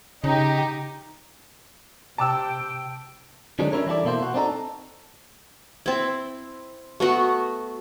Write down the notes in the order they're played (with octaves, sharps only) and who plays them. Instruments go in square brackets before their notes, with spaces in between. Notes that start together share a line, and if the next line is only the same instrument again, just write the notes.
[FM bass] C#3 [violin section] D#4 G4
[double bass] C3 [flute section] G5 [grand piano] A5 D6 E6
[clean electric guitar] D3 D#3 F#3 G#3 C4 D4
C#4 D4 E4 G4 A#4 C#5
E3 G3 E4 A4 D5
B2 A#3 E4 C5
F#4
C4 D4 D#4 A4 A#5
[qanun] C4 E4
A3 B3 F#4